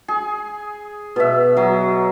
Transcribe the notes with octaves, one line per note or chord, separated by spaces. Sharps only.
G#4
B2 E5
F#3